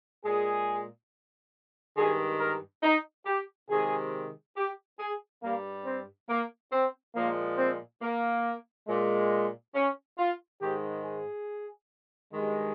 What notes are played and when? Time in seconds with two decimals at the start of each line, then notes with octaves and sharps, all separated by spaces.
0.25 A#2 G#3 G#4
1.97 G2 D#3 G#3 G#4
2.40 A#4
2.83 D#4
3.26 G4
3.69 C3 D#3 G#3 G#4
4.57 G4
4.99 G#4
5.43 G2 G3 A#3
5.85 C4
6.29 A#3
6.72 C4
7.15 A#2 F3 G#3 A#3
7.58 C4
8.02 A#3
8.88 A#2 G#3
9.75 C#4
10.18 F4
10.61 G#2 D#3 G#3 G4
11.04 G#4
12.33 G2 D#3 G#3